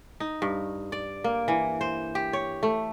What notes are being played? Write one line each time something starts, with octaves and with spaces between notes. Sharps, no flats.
D#4
G2
D5
A#3
E3
C5
G4
C#5
A3